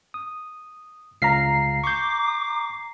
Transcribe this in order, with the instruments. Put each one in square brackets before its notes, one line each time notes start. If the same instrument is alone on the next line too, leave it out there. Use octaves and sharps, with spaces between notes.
[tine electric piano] D#6
[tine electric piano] C#2 F5 B6 [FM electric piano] A#5 C7
[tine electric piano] C#6 G6 [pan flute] D6